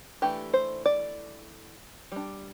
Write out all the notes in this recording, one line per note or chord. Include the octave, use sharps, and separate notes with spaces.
E3 A3 D4 G4
C5
D5
G3 D4